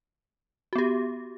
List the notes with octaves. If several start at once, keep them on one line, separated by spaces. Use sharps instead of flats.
B3 F#4 G4